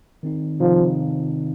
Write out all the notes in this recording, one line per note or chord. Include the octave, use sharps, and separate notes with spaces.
D#3 C4 D#4
C3 D#3 F3 C4 D#4